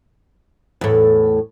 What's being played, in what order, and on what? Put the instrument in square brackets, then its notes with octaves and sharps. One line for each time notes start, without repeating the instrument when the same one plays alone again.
[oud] E2 A2